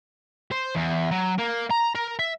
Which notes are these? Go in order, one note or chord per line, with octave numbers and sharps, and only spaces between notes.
C5
E2
F#3
A#3
A#5
A#4
E5